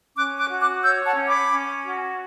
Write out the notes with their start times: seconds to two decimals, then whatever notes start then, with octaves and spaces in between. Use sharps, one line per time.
0.16 C#4 D6 F#6
0.38 D6 F#6
0.50 F#4
0.60 D6 F#6
0.83 C#5 E6 G6
1.05 F#5 A5
1.17 C#4
1.27 B5 D6
1.49 C#4
1.83 F#4